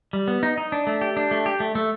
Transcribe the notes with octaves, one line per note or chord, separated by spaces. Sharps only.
G3
B3
D#4
D#4
D4
A3
G4
D4
A3
G4
A3
A3